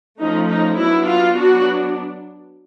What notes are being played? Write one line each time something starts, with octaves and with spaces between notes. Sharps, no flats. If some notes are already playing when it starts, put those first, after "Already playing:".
F3 A3 C#4 D#4
D#4
F#3 B3 D4 E4
F4
F#3 B3 D4 F#4